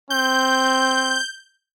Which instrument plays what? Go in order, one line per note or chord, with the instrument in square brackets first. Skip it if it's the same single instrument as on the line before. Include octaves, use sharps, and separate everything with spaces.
[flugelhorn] C4 [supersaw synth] G6